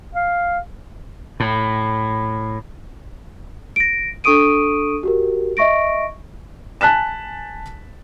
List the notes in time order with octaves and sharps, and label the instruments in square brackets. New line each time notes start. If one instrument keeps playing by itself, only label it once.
[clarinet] F5
[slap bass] A2
[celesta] A#6 D7
D4 A4 C#6 D#6 D7 D#7
F#4 G4 A#4
D#5 E5 C#6 A#6 D7
[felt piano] G#5 A5 F#6 B6 E7